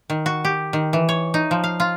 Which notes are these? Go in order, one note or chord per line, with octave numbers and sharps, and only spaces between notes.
D#3
F#4
G4
D#3
E3
C#5
D#4
F3
F5
F4